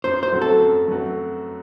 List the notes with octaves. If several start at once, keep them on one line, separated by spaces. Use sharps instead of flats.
F#2 C5
C5
F#3 A3 C4 F#4
A4
F#2
F#3 A3 C4 F#4